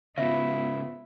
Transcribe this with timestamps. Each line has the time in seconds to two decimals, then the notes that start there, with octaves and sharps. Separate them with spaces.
0.18 G#2 C#3 B3 E4 F4 E5